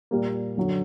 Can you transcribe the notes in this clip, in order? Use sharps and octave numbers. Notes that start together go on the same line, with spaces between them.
A#2 G3 A#3
F#2 D3 F#3